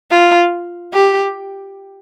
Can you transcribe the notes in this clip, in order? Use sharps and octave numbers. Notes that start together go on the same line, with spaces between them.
F4
G4